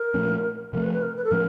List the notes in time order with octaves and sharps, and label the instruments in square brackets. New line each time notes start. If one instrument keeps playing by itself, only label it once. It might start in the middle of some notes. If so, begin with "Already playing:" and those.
Already playing: [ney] A#4
[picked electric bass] A#2 F3 A3 C#4
[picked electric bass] C3 F3 A3 [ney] A#4
[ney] B4
B4
A#4
B4
A4
[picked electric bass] A2 F3 G#3 C#4 [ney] A#4